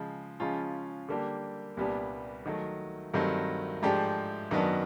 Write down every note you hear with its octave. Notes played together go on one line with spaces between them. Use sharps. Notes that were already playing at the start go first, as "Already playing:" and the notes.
Already playing: C#3 F3 G#3
C#3 F3 G#3 C#4 F4
D3 G3 A#3 D4 G4
C2 A#2 G3 B3 D4
D#3 F#3 A3
G2 D#3 F#3 A3 C4
G#2 F3 A3 D4 G4
F#2 D#3 F#3 B3 D4